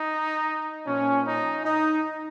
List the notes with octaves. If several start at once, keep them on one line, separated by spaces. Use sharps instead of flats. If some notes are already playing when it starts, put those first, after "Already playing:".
Already playing: D#4
A#2 F3 C#4
D#4
D#4